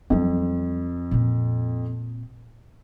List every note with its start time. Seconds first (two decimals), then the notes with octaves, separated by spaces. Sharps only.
0.10 F2 F#3 G3
1.11 A#2 C4